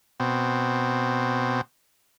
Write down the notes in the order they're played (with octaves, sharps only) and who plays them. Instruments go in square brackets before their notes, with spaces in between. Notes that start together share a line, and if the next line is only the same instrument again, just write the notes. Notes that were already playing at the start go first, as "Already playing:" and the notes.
[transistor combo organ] B2 C4